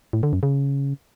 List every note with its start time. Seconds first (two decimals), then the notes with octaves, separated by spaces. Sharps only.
0.13 A2
0.23 D3
0.33 F#2
0.43 C#3